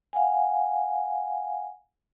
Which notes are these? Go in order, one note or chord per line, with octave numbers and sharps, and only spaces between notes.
F5 F#5 G#5